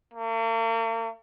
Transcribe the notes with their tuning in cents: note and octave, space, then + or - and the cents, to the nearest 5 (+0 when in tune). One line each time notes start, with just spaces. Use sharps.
A#3 -45